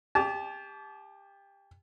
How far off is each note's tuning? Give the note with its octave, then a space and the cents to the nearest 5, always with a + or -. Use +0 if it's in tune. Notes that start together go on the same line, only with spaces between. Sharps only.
G4 +25 A5 -30 D6 -30